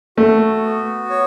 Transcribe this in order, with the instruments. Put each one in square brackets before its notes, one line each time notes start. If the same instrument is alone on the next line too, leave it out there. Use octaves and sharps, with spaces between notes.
[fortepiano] A3 [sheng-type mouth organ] F#4
[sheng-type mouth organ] B3
C#5